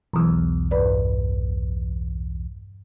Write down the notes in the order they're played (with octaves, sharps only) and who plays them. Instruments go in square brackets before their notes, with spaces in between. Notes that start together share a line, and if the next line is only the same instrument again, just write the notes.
[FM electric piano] B1 E2
[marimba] G2 B4 D5